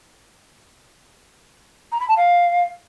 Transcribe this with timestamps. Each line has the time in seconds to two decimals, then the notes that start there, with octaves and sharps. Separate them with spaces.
1.92 A#5
2.00 B5
2.08 A5
2.17 F5